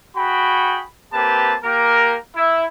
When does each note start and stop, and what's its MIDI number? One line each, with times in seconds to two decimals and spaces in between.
0.17 0.83 66
0.17 0.83 68
0.17 0.83 79
0.17 0.83 83
1.13 1.55 58
1.13 1.55 60
1.13 1.55 67
1.13 1.55 71
1.13 1.55 81
1.64 2.16 58
1.64 2.16 67
1.64 2.16 70
2.35 2.64 64